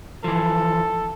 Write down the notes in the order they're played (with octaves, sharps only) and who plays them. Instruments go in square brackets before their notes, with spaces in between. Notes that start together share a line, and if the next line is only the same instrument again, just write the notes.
[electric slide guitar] E3 F3 [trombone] A4